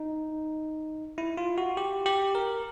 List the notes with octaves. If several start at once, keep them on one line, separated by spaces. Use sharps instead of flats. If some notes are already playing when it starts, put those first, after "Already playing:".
Already playing: D#4
E4
F4
F#4
G4
G4
A#4